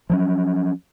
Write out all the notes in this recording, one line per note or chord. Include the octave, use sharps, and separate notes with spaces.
F3 F#3 C#4